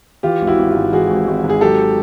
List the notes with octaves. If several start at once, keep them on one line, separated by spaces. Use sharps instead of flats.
E3 F4 G4
G#1
E4 F#4
G#1
F4 G4
G#2
E3 F#4 G#4
G#1
G#1
G#2
G#4
F#3 G4 A4